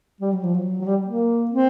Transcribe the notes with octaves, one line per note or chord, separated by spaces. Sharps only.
G3
F#3
F3
F#3
F#3
G3
A#3
C4